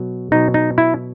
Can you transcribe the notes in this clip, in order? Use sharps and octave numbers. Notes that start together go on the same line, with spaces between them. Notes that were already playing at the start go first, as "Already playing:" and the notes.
Already playing: B2 F#3
B2 F#3 D#4
D#4
E4